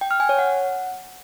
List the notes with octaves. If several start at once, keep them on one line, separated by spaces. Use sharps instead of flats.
G5
F6
G#5
C#5
F#5